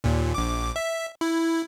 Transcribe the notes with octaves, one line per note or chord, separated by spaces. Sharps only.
D#2 A#2
A#1 D6
E5
E4